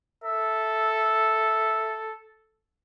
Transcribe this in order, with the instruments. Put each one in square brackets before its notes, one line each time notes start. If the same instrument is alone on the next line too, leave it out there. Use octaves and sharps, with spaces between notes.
[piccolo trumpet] A4 [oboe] E5